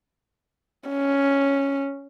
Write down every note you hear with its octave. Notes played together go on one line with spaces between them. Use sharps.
C#4